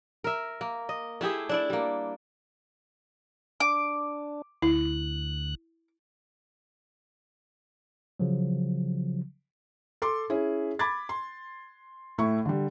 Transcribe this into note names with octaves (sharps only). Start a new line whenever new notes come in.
A#4 E5
A#3
D#5
A3 E4 G4 G#4
D4 E4 D5
G3 A#3
D4 D6
D2 E4 F#6
C#3 F3 F#3
A4 C6 D6
C#4 E4 G#4
B5 D6 G#6 A6
C6
A2 A3 E4 C#6
D3 G3